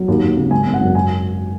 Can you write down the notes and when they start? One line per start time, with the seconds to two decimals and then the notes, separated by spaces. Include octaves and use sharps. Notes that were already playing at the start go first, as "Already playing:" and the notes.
Already playing: F#3
0.08 D#2
0.22 D#2
0.37 C#3
0.51 G#1 G#5
0.66 G#1
0.74 F#5
0.80 F#2
0.95 G#5